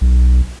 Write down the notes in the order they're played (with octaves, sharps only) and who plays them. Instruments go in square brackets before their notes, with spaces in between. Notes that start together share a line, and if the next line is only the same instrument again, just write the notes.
[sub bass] B1